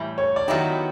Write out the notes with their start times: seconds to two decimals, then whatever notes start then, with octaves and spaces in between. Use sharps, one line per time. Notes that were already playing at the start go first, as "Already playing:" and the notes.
Already playing: A2 E3 G3
0.18 C#5
0.36 D5
0.48 D#3 F#3 B3 D#4 E4 G4 D#5